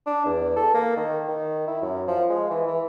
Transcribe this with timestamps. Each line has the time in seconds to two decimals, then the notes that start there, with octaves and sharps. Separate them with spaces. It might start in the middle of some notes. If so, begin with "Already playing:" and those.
0.06 D4
0.25 E2
0.56 A4
0.74 A#3
0.97 D#3
1.28 D#3
1.67 E4
1.82 F#2
2.08 F3
2.30 G#3
2.51 E3
2.67 E3